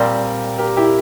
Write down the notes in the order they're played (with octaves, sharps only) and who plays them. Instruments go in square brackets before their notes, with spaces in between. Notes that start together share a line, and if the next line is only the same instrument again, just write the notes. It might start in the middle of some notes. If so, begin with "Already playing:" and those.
Already playing: [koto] A#2 G3 C4 [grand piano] A#4 D5
[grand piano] G4 A#4
E4 G4